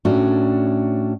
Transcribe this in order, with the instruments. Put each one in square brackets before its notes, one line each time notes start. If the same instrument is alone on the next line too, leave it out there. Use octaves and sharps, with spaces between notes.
[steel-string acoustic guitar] A2 C#4 D4 F#4